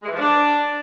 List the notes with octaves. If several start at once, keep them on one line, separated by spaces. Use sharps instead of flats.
G#3
E3
F3
D4